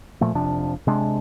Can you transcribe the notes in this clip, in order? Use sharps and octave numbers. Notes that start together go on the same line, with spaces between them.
A#2 F3 A3
F1 C3 F3 D4
C3 G#3 D4